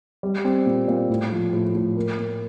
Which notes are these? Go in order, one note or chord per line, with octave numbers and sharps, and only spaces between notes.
G3
C4
A#2
A#2
A2
F3
A2
A2
A#3
A#3